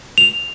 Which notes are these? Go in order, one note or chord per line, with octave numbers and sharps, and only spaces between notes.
F7